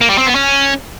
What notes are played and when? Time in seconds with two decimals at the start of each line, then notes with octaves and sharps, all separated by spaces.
0.01 A#3
0.10 G3
0.18 C4
0.27 B3
0.35 C#4